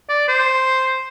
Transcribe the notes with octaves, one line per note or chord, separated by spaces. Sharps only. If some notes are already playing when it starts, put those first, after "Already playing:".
D5
C5